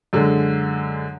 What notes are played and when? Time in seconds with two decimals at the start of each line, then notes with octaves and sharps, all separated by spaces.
0.13 F#2 D3 G#3